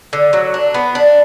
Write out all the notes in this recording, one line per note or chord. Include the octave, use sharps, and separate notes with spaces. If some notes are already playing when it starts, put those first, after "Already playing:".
D3
F#3
D4
B3
D4